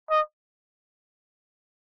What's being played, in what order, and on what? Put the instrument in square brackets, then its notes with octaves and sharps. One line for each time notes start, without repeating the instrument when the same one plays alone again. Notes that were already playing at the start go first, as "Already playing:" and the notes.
[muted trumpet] D#5